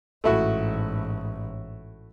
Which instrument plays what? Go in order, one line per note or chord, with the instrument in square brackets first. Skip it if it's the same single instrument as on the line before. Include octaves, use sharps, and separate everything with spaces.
[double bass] A1 G#2 [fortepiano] A3 E4 F#4